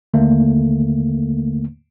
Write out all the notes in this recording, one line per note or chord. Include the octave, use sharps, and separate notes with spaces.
D#2 D3 A3 A#3